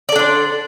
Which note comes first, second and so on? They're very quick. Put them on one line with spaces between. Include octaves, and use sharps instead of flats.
D5 A4 D4 C5